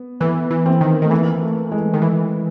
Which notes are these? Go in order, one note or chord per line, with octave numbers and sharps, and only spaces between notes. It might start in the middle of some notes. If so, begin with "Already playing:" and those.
Already playing: B3
E3 B3
E3
C4
D#3
D#3 A3
E3 A#3
A3
G#3
D#3
E3